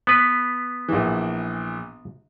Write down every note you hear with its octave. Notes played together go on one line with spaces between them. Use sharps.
B3 B4
A#1 E3